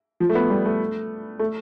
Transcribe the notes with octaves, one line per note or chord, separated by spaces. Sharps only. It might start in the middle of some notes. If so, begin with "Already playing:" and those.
F3
A3
B3
G3
A3
A3